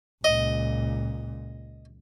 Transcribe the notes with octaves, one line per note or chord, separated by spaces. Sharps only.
C#2 A#2 D#5